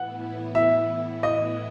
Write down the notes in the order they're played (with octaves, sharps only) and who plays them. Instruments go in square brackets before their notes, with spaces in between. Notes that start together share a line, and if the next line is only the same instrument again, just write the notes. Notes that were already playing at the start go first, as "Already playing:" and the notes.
Already playing: [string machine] A2 E3 B3 E4 [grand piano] F#5
[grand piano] E5
D#5